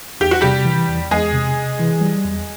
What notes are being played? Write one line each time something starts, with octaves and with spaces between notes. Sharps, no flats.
E2 G4
F#4
C3 G3 G4
E3
E2
E2 G#3 G#4
C3
C3
E3
G3
E2